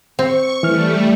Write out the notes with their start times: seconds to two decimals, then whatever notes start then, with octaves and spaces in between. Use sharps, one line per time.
0.19 C4 C#6
0.63 E3 G3 A3 F6